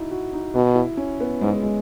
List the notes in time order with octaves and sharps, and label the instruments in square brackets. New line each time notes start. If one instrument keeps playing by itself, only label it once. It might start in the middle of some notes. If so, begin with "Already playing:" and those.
Already playing: [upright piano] D#4 E4 F#4
F#4
D#4
[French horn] B2 [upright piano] F#4
[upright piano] E4
C#4
B3
[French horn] G#2 [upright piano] G#3
[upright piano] G#3